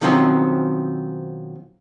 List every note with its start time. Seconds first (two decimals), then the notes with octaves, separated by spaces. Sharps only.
0.01 B2 D#3 F3 F#3 C4 C#4